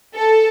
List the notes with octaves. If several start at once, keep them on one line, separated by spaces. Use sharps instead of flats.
A4